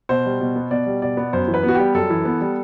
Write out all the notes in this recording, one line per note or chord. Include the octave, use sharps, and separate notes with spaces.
B2 C5
G3
B2
B3
B2 D5
G3
B2 D5
B3
F#2 C5
E3
B4
B3 F#4
G3 G4
F#2 A4
E3
B3
G3